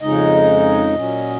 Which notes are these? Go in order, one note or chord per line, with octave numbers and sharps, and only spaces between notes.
F2 C#3 G#3 D#4 D#5
A#2 F#3 C#4